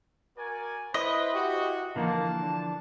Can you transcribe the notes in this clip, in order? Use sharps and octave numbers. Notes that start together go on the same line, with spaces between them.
F#4 A#4 D5 G#5
E4 B4 C5 D#5
F#4 G4
D3 E3 F3 A#3 A5
D4